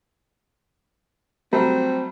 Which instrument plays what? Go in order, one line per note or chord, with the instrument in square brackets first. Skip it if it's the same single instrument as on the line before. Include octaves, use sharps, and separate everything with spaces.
[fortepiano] F#3 G3 A3 [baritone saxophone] C4